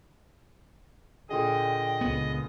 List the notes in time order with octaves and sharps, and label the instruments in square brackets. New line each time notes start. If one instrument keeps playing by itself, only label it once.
[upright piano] A#2 D3 G#4 [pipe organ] D#5 [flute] G5
[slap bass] C#2 B3